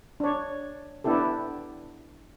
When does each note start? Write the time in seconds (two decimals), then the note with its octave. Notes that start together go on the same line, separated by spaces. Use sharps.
0.20 D4 C#5
1.04 B3 D4 E4 G4 A4